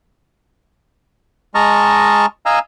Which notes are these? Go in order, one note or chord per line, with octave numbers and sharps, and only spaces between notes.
G#3 D#5 A5 A#5 C#6 F6
D#5 F5 G#5 A#5 E6